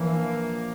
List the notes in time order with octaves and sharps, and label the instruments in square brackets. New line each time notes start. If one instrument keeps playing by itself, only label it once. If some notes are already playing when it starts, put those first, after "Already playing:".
Already playing: [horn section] A#2 F3 A#3 D4 [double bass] E3